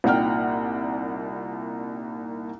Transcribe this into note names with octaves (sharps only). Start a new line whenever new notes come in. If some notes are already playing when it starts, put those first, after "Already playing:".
C2 A#2 D#4 F#5 G5 F6